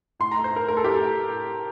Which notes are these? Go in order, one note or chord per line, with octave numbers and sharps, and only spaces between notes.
A2 C6
A3 A#5
C5
A3 A#4
A3 A#4
A4
A2 G4
A4
A2